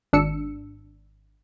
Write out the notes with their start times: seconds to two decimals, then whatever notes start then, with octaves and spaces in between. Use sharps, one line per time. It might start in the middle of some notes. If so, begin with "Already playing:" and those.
0.13 G#1 D4 E6 C#7